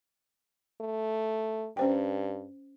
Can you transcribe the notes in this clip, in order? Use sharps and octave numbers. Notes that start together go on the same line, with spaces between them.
A3
G2 C#4 C5 G5